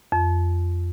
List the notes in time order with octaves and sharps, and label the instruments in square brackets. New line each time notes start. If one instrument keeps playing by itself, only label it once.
[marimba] F2